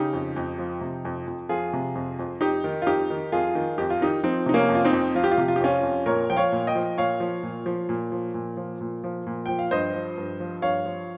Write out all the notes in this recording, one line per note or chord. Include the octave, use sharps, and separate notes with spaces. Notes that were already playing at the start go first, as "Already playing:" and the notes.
Already playing: C#3 D#4 G4
F2
F2
F3
C3
F2
F2
F3 F4 G#4
C3
F2
F2
F2 D#4 G4
D#3
F4
F2 D#4 G4
D#3
F2 F4 G#4
D#3
F2 G4
F4
D#3 D#4 G4
F3 C4 D#4
C3 D#4
A#3 C#4
F2
F4
C4 D#4
F2
F3 F4
G4
F4
C3 G4
F4
G4
F2 C#4 F4
F2
A#2 A#4 C#5
F3 G5
C#5 F5
A#2
D#5 G5
F3
A#2 C#5 F5
F3
A#2
F3
A#2
F3
A#2
F3
A#2
F3
A#2
F3 G5
F5
G2 C5 D#5
F3
G2
F3
G2 C#5 F5
F3